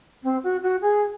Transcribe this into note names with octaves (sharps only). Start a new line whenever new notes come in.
C4
F#4
F#4
G#4